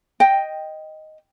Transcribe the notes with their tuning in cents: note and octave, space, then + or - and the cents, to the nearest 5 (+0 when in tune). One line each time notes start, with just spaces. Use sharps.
D#5 +0 G5 +0